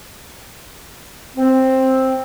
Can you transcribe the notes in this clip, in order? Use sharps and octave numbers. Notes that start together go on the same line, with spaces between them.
C4